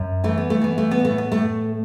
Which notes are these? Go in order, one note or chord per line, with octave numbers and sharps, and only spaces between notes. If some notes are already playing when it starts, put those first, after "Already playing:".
Already playing: F#2
E3 A3
B3
A3
E3 B3
A3
B3
A2
A3
B3
A3
A2